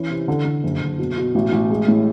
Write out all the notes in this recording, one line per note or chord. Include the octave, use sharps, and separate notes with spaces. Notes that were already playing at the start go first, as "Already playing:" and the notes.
Already playing: E3 C#4
C3
D3
D3
F#1
F#1
B2
B2
A1
A1
G#3
A2